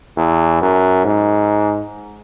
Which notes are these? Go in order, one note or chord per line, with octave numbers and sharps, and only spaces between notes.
E2
F#2
G#2